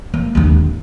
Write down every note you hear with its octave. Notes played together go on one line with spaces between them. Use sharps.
A#3
D1 D#2